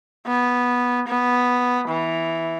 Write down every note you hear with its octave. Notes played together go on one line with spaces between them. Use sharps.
B3
B3
E3